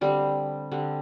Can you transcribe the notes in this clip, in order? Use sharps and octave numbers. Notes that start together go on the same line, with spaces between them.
D3 G3 C4
D3 G3 C4